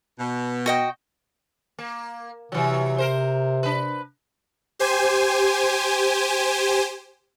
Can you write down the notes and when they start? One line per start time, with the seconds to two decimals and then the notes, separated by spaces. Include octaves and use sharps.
0.19 B2
0.66 F#4 D#5 G5
1.79 A#3
2.52 C3 E3 F#3
2.98 A#4 C5
3.63 D4 B4
4.79 G4 C5 G#5